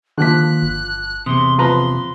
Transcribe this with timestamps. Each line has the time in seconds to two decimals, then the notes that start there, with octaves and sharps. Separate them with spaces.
0.18 D3 D#3 F3 A#3 F#6 B6
0.63 G1
1.26 E2 C3 C6 D#6
1.58 F3 B4 A#5 C6